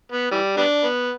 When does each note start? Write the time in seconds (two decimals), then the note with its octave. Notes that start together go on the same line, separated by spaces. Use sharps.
0.12 B3
0.32 E3 G3
0.57 G3 B3 D4
0.84 B3